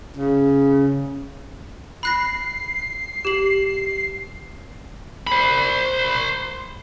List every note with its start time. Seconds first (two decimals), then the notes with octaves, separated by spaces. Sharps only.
0.17 C#3
2.03 B5 F#6 A#6 C7
3.25 G4 F#7
5.27 C5 B5